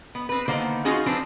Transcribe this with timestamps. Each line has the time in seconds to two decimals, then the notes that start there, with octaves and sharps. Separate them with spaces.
0.15 B3
0.29 C4 B4
0.48 D3 D#3 A#3 B3 C5
0.85 C#4 D#4 F4 F#4 G#4
1.06 F3 C4 D4 B4